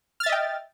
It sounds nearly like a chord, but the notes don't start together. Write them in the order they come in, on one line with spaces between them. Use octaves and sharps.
F6 A6 E5 D#5 G5